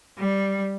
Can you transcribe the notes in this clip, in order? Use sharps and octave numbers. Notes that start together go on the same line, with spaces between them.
G3